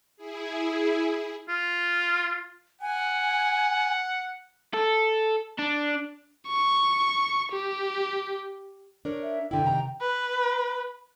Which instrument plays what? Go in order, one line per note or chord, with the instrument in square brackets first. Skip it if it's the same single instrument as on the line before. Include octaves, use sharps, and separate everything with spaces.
[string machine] E4 G#4
[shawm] F4
[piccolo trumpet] F#5 [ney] G#5
[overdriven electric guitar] A4
D4
[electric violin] C#6
G4
[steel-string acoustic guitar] D4 A#4 C#5
[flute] E5
[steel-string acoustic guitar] B2 D3 E4 [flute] G5
[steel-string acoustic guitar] C3 D#3 A#5
[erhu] B4